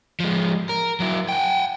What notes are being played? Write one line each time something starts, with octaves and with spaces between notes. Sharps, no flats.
F3 G#3
A#4
F#3 E4
F#5 G5